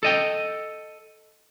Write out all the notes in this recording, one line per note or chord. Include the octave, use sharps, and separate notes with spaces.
A4 D#5 G5